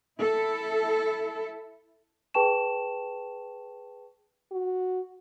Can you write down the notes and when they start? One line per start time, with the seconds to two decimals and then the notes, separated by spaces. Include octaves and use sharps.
0.21 E4 A4
2.34 G#4 B4 G5 A5 C#6 E7
4.52 F#4